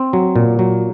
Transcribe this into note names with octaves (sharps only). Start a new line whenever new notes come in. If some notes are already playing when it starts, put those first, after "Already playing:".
Already playing: C4
F#3
A#2
F#3